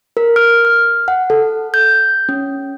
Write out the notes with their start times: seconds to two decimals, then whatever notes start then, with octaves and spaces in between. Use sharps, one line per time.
0.17 A#4
0.36 F6
0.65 F6
1.08 F#5
1.30 A4
1.74 G6
2.29 C#4